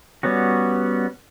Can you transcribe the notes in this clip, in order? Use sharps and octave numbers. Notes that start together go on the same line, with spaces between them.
G3 B3 C#4 F#4